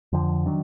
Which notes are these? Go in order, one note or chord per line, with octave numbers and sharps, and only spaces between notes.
F2 D3 F3
D#3 F#3 D4